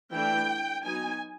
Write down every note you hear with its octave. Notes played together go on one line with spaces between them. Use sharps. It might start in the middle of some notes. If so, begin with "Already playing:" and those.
E3 A3 D4 G5
F#3 B3 D#4 G#5